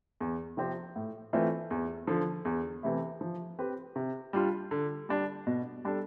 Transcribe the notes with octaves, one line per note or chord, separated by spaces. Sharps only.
E2
C3 F3 C4 G4
A2
E3 A3 C4 F4
E2
D3 F3
E2
C3 E3 A3 E4
F3
C4 G4 B4
C3
G3 D4 F4
D3
G3 D4
B2
G3 D4 A4